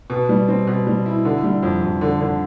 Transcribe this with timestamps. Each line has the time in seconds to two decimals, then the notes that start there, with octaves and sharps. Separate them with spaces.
0.10 B2
0.29 G3
0.48 C4
0.67 B2
0.87 G3
1.06 E4
1.25 D3
1.43 G3
1.63 F2
1.83 F2
2.01 D3
2.21 D3